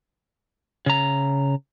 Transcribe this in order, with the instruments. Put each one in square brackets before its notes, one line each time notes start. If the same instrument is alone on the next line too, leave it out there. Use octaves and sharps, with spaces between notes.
[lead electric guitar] C#3 A#5